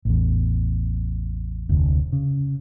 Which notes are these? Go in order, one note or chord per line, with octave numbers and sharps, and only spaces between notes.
A1 E2
F1 D2
C#3